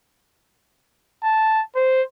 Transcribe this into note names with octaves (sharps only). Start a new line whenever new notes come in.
A5
C5